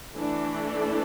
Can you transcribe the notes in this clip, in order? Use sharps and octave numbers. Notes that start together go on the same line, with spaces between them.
E3 A3 D4